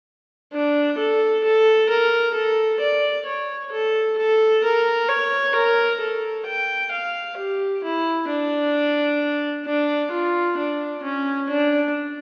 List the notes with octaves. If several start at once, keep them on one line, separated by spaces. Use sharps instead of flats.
D4
A4
A4
A#4
A4
D5
C#5
A4
A4
A#4
C#5
A#4
A4
G5
F5
G4
E4
D4
D4
F4
D4
C#4
D4